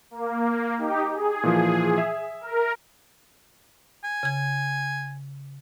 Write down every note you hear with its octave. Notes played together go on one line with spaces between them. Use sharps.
A#3
D#4 G4
G#4
A#2 E3 F3
E5
A#4
G#5
C#3 G#6